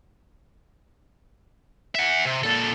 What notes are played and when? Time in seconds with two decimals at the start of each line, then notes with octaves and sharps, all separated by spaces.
1.95 E5 F#5
2.25 C3
2.44 A#2 A4